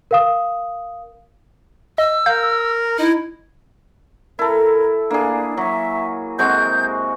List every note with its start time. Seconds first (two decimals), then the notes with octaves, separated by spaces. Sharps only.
0.11 A#4 F5 D#6
1.98 D#5 E6
2.26 A#4 F5 G6
2.99 D#4 E4
4.39 E4 A4 A#4
5.11 A#3 D4 G#4
5.57 F#3 E5
6.39 C3 G#3 F#4 G6